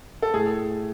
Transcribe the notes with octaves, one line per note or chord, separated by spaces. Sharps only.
A4
A2 G#4